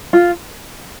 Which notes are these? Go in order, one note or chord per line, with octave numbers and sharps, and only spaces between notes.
F4